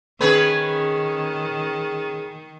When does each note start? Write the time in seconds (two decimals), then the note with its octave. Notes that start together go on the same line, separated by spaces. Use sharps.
0.21 D#3 C#4 G#4 B4